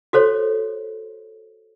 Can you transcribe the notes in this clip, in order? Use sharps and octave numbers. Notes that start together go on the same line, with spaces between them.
F#4 A4 C5 C#5